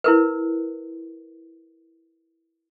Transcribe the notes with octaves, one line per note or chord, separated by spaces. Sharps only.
E4 A#4 B4